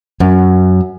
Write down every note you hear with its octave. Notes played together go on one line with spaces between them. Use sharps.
F#2